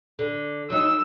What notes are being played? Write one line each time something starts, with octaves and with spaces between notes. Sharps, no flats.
D3
F#3 D#4 E6